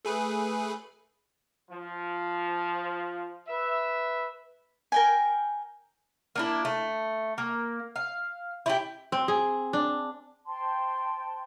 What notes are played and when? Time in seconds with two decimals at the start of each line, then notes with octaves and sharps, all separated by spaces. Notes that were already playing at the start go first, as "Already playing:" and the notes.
0.05 A3 G#4 B4
1.69 F3
3.47 B4 E5
4.92 A#4 G5 G#5
6.36 A#3 D4 E4
6.65 A3
7.38 A#3
7.96 F5
8.66 E4 F4 G4
9.12 C4
9.28 G#4
9.73 D4
10.46 C5 G5 A5 C6